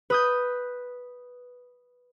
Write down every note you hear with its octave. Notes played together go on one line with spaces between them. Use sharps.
B4 D#6 G6